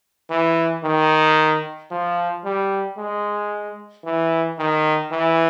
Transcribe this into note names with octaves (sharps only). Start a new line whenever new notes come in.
E3
D#3
F3
G3
G#3
E3
D#3
E3